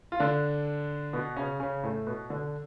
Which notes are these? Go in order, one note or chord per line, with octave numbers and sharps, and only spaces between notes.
F4
D3 D4
B2 B3
C#3 C#4
C#3 C#4
A2 A3
B2 B3
D3 D4